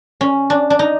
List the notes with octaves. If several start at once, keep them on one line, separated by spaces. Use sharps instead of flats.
C#4
D4
D4
D#4